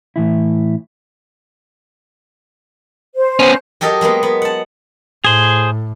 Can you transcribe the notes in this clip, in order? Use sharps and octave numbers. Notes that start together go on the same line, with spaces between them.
A2 E3 E4
C5
B3 C#4
F#3 G4 A4 A#4 D#5
F#3 G#3 A#3 B3
B3
F#5 A5
A2 G#4 C5